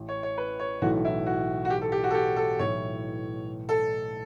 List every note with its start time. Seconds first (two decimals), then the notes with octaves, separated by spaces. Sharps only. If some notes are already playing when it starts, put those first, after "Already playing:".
Already playing: A1 A2
0.09 C#5
0.23 C#5
0.38 B4
0.60 C#5
0.82 B1 A2 E3 A3 F#4
1.05 E4
1.26 F#4
1.65 F#4
1.70 G4
1.81 A4
1.92 G4
2.04 F#4
2.11 A4
2.15 G4
2.36 A4
2.59 B1 A2 E3 A3 C#5
3.69 A4